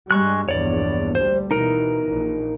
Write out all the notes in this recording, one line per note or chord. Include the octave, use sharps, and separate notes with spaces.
G2 G3 G#3 C#6 F#6
A#1 E2 G2 C#5 D5
D2 G3 C5
B2 E3 D#4 A#4
A#1 A#2